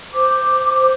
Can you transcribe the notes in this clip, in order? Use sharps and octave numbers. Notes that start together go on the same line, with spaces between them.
C5 D6